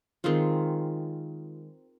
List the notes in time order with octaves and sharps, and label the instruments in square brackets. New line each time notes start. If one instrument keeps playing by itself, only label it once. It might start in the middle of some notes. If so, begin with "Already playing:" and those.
[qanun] D#3 G#3 C4 F4